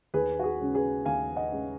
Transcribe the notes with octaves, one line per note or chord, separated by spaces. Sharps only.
D#2 G#4 B4
F#4
G#4
C#3 G#3 C#4
G#4 B4
D#2 F5 G#5
D#5 F#5
C#3 G#3 C#4